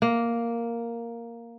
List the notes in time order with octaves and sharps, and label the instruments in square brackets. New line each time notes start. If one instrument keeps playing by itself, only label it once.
[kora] A#3